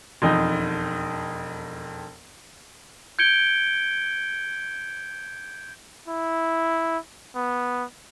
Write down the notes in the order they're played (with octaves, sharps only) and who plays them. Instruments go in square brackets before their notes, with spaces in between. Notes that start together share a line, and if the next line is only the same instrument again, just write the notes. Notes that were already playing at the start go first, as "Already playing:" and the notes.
[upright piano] E1 F2 D#4
[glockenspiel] G6 G#6 C#7 D7 G7
[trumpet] E4
B3